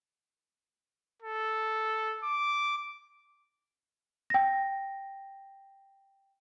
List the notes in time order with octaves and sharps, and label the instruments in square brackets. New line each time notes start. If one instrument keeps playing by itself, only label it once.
[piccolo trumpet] A4
D6
[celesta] G5 A#6